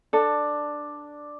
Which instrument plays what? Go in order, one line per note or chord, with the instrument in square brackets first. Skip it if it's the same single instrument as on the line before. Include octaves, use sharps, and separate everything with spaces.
[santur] D4 [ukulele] A4